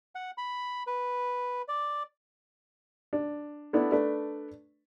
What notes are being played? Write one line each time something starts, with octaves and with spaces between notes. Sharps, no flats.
F#5
B5
B4
D5
D4
A3 B3 D4 E4
A3 D4 B4